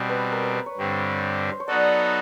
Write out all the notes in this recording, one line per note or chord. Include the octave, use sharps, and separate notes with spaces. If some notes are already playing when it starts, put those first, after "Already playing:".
Already playing: B2 G3 C4
B4
A#4
B4
B4
C#5
G2 D3 G3 C4
C5
C#5
F#3 B3 D#4 F#4 A4 D5